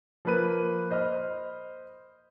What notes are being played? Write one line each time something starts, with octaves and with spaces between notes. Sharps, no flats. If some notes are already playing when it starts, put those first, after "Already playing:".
F3 A#3 A#4 B4 F#6 D#7
C5 D#5 B5 F6